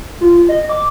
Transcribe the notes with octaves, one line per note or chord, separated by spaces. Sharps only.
F4
D#5
D6